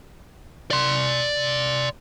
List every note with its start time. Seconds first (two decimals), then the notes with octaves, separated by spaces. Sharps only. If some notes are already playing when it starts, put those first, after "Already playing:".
0.71 D5 C6